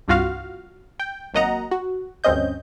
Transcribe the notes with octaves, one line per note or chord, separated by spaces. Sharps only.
C2 G2 F4 F#4 F5
G5
G#1 F#3 A#3 D#5 F#5 A#5
F#4
D2 G2 C4 C#4 D#5 G6